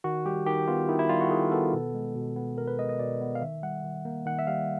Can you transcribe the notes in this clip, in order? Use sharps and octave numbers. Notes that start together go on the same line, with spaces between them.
D#3 F#4
G3 G4
D#3 G4
B3 F4
D#3 E4
E4
G3 F4
F#4
D#3 G#4
B3 A4
B2
G#3
B2
B3
B2 A#4
B4
G#3 D#5
D#5
B2 D5
B3
F5
D#3 E5
G3 F#5
D#3
A#3
D#3 F#5
E5
G3 F5